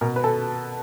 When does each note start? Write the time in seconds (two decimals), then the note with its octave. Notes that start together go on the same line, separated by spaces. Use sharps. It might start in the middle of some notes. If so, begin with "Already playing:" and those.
0.01 B2 A#4
0.16 B4
0.24 A4